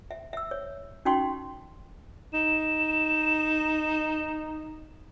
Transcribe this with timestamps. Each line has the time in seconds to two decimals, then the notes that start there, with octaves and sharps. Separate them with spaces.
0.11 E5
0.33 E5 E6
0.51 C#5
1.05 C#4 D#4 F#4 G5 C6 C#6
2.34 D#4 E7